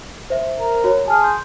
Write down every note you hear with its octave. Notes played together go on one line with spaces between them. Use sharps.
C5 E5
A#4
F#4 C#5
G#4 A5 F6
C6 G6